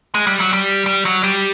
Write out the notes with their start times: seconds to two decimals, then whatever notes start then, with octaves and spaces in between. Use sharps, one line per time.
0.15 G#3
0.27 G3
0.40 F#3
0.53 G3
0.86 G3
1.05 F#3
1.23 G3